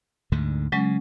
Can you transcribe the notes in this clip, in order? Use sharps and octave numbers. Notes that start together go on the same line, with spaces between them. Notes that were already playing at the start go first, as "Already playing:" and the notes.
D2 G#2 D3
C#3 F#3 G#3 C#4